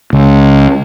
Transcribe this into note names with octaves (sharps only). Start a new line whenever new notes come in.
C#2